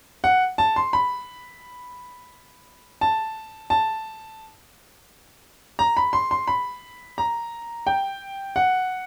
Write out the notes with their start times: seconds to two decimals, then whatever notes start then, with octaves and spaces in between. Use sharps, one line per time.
0.24 F#5
0.58 A5
0.76 C6
0.93 B5
3.01 A5
3.70 A5
5.79 A#5
5.97 B5
6.13 C6
6.31 C6
6.48 B5
7.18 A#5
7.87 G5
8.56 F#5